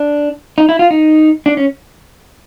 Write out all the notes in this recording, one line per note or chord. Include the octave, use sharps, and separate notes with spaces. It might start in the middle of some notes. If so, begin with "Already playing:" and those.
Already playing: D4
D#4
E4
F4
D#4
D4
C#4